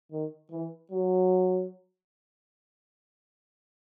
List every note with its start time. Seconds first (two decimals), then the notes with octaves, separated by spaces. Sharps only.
0.12 D#3
0.51 E3
0.92 F#3